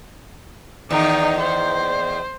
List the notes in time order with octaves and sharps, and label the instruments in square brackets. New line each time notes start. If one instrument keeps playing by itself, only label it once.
[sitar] E2 D#3 [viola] D#4
[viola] C5